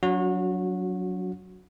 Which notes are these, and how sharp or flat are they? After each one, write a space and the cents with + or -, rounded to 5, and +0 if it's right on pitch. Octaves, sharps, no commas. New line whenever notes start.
F#3 +0 D4 -45 F#4 -25